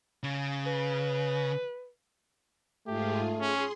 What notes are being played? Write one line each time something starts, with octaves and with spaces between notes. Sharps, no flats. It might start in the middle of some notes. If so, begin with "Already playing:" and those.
C#3
B4
G#2 A3 F4 G4 G#4
C#4 G#4 C6